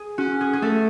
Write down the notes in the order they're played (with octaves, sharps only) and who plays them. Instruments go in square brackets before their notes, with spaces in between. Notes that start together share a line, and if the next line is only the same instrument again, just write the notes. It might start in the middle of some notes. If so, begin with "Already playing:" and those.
Already playing: [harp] G#4
[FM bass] C#4 [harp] F#4
[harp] G#4
G#4
[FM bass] A3 [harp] A4